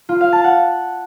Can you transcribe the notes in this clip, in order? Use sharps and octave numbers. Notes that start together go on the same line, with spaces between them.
F4
F5
A5
F#5